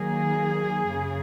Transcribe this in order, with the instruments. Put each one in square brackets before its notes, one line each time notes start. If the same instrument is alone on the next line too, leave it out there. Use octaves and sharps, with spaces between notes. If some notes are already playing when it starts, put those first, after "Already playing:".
Already playing: [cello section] D#3 F#3 A#3 G#4
F#2 C#3